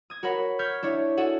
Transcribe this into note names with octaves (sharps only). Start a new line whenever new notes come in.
D#6 G#6
F#4 A#4 C#5 F#5 B5
C#6 F6 G6 G#6 B6
D4 E4 C#5
F#4 G#4 A4 F#5